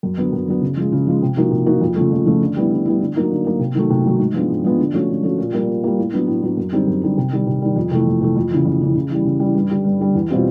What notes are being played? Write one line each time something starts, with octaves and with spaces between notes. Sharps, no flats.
F#2
D3 F#3 B3
F#2
D3 F#3 B3
C#3
F3 G#3
C#3
F3 G#3
C3
F3 A#3 D#4 F#4
C3
F3 A#3 D#4 F#4
F2
C#3 F3 A3
F2
C#3 F3 A3
D3
G3 B3 E4
D3
G3 B3 E4
D3
F#3 A#3 D#4
D3
F#3 A#3 D#4
C3
D#3 F#3 A3
C3
D#3 F#3 A3
G#2
F3 G#3 B3 D4
G#2
F3 G#3 B3 D4
D3
F3 A3 C#4 F#4
D3
F3 A3 C#4 F#4
A#2
G3 A#3
A#2
G3 A#3
A2
F#3 B3 D4
A2
F#3 B3 D4
F#2
D3 G3 C4 D#4
F#2
D3 G3 C4 D#4
C3
D#3 G3
C3
D#3 G3
F2
C3 E3 A3
F2
C3 E3 A3
F2
C#3 E3
F2
C#3 E3
C#3
E3 G3
C#3
E3 G3
G2
D3 G3
G2
D3 G3
E2
B2 G3 C4 F4